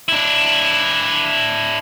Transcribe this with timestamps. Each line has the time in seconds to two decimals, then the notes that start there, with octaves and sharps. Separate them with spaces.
0.08 D4 E4